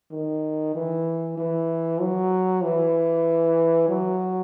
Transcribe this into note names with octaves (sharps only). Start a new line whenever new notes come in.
D#3
E3
E3
F#3
E3
F#3